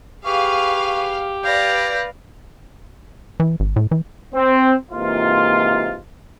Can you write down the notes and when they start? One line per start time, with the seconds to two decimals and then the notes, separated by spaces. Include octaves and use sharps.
0.25 G4 G#4 B4 F5 C#6
1.43 B4 D5 F5 G6 A#6
3.40 E3
3.60 G#1
3.76 A2
3.91 E3
4.34 C4
4.91 G#2 C3 E3 A#3 F4